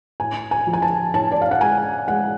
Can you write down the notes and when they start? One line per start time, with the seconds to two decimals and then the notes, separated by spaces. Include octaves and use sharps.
0.20 A2 G#5
0.51 G#5
0.67 F3
0.73 G#5
0.82 A5
1.14 A2 A5
1.31 D5
1.42 F5
1.51 F#5
1.61 G#3 G#5
2.08 G#3 F#5